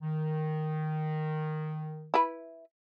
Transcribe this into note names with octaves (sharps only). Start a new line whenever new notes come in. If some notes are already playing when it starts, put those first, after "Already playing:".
D#3
E4 B4